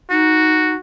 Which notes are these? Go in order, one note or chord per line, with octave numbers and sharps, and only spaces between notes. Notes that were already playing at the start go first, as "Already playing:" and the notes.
D#4 F#4